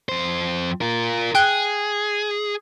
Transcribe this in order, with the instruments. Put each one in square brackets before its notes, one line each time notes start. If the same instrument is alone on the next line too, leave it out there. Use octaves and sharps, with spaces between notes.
[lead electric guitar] F2 C5
F4 A#4
[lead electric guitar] G#4 [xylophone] G5 F#6 G7